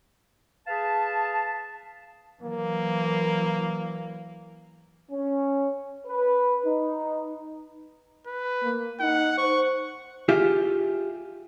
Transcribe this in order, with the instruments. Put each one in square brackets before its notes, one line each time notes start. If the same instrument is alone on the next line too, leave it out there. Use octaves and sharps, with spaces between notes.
[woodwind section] G#4 B4 F5 A5
[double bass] E3 F#3 [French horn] A#3
[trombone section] C#4
B4
D#4
[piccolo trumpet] B4
[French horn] A#3
[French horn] D#4 [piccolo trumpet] F#5
[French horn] C5 [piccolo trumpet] C#6
[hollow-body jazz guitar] F4 G4 G#4 E5